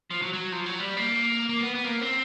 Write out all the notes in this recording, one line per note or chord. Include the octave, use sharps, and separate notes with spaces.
F3
F#3
F#3
F3
F#3
G3
A#3
A#3
B3
B3
A#3
C4